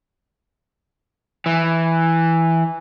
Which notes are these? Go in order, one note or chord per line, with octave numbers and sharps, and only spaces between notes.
E3